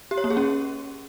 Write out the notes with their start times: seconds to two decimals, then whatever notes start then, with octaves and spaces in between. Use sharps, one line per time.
0.11 G4
0.18 C#5
0.24 A#3
0.30 G#4
0.37 C#4